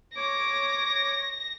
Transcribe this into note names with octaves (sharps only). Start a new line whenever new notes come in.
C#5 D6 A#6